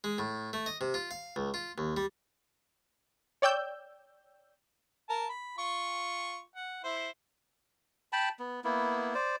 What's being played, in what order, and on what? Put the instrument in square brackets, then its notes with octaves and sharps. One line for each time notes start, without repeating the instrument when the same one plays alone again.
[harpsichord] G#3
A2
A3
D#5
C3
F4
F5
C#2
F4
D#2
G3
[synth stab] C#5 D5 G5 E6 G6
[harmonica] A#4 A5
B5
F4 C#6
F#5
E4 C5
[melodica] G5 A5 B5
B3
A#3 B3 E4
C5 D5